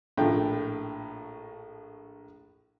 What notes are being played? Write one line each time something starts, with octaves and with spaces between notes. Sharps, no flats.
A#1 A2 F4 G5